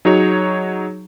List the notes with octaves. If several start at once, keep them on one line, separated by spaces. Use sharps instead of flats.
F#3 D#4 F#4 G#4 C#5